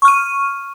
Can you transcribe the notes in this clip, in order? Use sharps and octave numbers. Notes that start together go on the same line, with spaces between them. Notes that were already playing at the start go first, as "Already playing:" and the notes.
C#6 F6 D#7